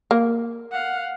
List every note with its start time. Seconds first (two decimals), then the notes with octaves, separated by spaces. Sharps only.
0.11 A#3
0.72 F5 F#5